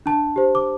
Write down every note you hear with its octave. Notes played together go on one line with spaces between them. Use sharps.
D4 A5
G4 C5
D6